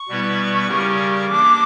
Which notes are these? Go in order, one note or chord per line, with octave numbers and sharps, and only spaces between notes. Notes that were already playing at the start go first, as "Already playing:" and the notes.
Already playing: C#6
B2 G3 B3 E4 B4
C#3 G3 C#4 G4 A#4
E3 A#3 D4 D6